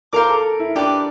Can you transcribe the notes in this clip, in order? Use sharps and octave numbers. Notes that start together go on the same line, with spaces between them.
A#4 C5 F5 A#5 D6
A4
E4
D4 G4 B4 D5